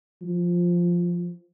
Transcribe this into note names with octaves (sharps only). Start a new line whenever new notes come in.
F3